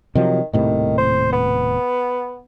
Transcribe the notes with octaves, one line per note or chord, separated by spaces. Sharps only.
C3 D#3 F3 F#3
D#1 A2 C3 D#3
C5
B3